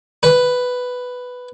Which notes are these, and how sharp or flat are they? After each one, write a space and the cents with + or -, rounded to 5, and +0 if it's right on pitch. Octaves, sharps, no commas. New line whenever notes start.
B4 +5